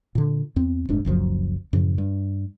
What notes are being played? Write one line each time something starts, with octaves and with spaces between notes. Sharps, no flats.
A#2 D3
E2 C4
F1 G#2 D4
F#1 C#2 F#2 F3
F#2 A2 C#3 F3
G2